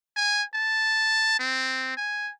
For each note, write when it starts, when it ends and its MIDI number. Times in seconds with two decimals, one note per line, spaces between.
0.17 0.43 80
0.54 1.36 81
1.39 1.94 60
1.97 2.31 80